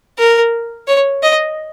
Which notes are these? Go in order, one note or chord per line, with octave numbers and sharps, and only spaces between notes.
A#4
C#5
D#5